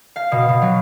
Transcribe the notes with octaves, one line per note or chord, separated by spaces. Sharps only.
F5
B2
B2
F#3